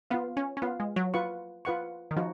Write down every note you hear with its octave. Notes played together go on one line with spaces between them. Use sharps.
B3 F4 B4 F5
C#4
C#4
B3 F4 B4 F5
G#3
F#3
F4 B4 F#5 C#6
F4 B4 F#5 C#6
D#3
F3 D#4 F#4